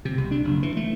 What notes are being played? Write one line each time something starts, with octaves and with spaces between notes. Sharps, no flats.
C3
C2
D4
F#1
E3
A3